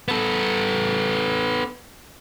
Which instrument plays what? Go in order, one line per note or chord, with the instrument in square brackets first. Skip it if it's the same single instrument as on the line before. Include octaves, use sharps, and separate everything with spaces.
[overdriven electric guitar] B3 A4